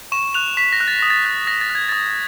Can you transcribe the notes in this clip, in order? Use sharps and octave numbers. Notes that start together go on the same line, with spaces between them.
C#6 E7
F#6 F7
C#6 B6
A#6
F#6
A6
D#6 A#6
A6
F#6
D#6 A#6
A6
F#6
G#6
D#6 A6